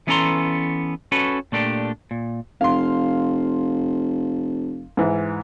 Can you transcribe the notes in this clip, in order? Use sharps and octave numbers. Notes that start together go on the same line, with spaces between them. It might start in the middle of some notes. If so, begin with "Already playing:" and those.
E3 B3 C#4 A4 A#5 C6
C#4 F#4 A4 B4
A#2 A3 D4 G4
A#2
F1 F5 C6
G#2 E3